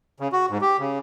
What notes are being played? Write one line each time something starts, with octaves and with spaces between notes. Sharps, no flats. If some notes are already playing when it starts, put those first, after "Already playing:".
C#3
F#4
G#2
G4
C#3